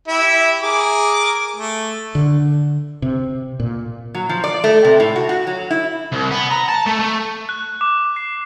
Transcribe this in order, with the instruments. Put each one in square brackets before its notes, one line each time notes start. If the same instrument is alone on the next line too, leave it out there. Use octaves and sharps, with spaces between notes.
[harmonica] E4 G4 E5
G#4 A#4 D6
A3
[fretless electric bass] D3
C3
A#2
[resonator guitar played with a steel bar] F#3
F3
D5
A3
C3
A2
F#4
F#4
F#3
E4
[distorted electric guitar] C2
B3
A#5
A5
A3
A3
[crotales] F#6
D6
C7